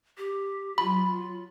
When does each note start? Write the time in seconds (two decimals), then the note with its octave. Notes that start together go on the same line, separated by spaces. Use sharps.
0.18 G4
0.78 F#3 F4 B5